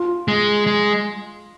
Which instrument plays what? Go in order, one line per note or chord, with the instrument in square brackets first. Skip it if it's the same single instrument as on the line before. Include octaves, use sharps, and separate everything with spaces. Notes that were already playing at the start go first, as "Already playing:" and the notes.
Already playing: [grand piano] F4
[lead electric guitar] G#3
G#3